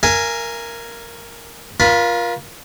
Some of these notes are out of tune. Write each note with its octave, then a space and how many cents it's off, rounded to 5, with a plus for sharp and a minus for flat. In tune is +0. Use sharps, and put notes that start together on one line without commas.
A#4 +0 E5 +45 G#5 +0
F4 +0 A#4 +35 B5 +0